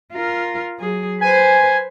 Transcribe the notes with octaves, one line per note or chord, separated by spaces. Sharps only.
F4 A#4
F#3 G#4
B4 C5 G#5